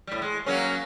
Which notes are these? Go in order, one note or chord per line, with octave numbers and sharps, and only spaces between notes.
A2 G3
G#3
F#3 A#3 C#4